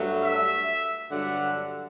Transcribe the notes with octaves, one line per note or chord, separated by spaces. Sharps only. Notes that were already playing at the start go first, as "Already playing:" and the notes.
Already playing: G2 F#3 A3
E5
G2 D3 F#3 F#5